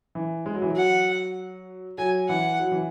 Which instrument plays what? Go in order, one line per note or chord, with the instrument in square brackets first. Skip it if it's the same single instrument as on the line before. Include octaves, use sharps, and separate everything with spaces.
[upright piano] E3
G#3
F#3
E3
F#3
[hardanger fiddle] F#5
[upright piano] F#3 [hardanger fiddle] G#5
[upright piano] E3 [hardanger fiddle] F#5
[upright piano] F#3
E3